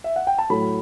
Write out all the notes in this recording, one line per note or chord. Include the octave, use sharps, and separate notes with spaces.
E5
F#5
G5
A5
A2 F#3 A3 B5